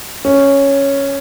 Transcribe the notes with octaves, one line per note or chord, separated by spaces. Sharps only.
C#4